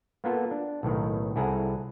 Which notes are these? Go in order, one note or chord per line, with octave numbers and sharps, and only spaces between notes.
A#3 B3 F4 A4
D4
B1 A2 D#3
C2 E4 G#4 A4 F#5 A#5